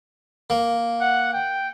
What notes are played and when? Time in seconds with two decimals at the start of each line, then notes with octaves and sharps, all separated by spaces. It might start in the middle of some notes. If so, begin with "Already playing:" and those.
0.50 A#3
1.01 F#5
1.33 G5